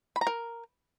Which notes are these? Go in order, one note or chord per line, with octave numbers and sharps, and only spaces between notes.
B5
A#5
A#4